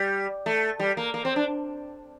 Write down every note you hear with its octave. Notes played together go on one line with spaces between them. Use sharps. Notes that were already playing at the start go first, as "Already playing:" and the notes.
Already playing: G3
A3
G3
A#3
A#3
C4
D4